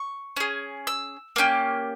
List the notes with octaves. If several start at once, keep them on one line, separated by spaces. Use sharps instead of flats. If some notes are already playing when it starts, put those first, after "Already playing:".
Already playing: C#6
C#4 G#4
E6
A#3 C#4 G4